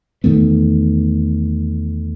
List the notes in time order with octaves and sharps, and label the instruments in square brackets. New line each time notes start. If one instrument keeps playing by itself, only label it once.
[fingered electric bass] E2 D#3 A3 B3